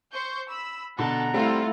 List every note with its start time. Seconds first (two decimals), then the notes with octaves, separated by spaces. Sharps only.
0.11 C5 C#6 G6
0.49 B5 E6
0.99 B2 D3 A4 F#5 A#5
1.34 G3 A3 C4 E4 F4